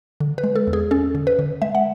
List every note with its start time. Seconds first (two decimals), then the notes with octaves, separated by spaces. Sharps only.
0.20 D3
0.38 B4
0.44 G#3
0.56 A4
0.67 E2
0.73 G#4
0.91 C#4 A4
1.15 D3
1.27 B4
1.39 D3
1.62 G#3 E5
1.75 F#5